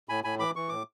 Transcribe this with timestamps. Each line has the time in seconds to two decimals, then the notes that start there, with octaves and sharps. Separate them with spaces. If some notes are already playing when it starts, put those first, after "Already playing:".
0.09 A2 G#5 B5
0.24 A2 G#5 B5
0.39 E3 B5 D6
0.56 E3 C#6
0.69 A2 D6